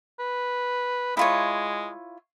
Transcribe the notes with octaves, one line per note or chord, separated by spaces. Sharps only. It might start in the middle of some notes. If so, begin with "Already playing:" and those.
B4
G#3 E4 F4 C#5